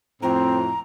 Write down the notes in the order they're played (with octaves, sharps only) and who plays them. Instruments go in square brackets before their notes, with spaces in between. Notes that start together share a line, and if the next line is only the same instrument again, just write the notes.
[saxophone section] F2 A2 [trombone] C4 [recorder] A#5